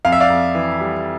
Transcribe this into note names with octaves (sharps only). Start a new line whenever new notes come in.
F2 F5
E5
D5 F5
F2
E3
G3